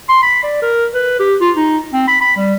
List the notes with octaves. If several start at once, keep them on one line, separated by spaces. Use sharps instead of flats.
C6
B5
D5
A#4
B4
G4
F4
D#4
C4
B5
B5
G3